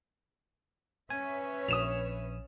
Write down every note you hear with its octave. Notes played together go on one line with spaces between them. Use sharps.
C#4 B4 C#5 E5 G#5
A#1 D#6 E7 F7